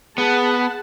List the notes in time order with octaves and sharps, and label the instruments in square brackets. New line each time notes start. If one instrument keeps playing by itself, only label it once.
[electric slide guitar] B3 [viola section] G#4 F#5 A5